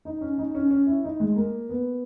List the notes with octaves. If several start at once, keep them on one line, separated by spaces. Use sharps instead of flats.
D#4
C#4
D#4
C#4
C#4
E4
D#4
G#3
A#3
B3